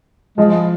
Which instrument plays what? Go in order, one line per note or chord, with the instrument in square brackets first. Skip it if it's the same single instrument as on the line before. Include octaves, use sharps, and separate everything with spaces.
[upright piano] F3 [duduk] G#3